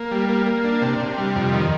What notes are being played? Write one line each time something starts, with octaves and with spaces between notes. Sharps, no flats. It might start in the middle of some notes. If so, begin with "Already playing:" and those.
Already playing: A#3
G3
A#3
A#3
D4
C3
C3
G3
F2
D#3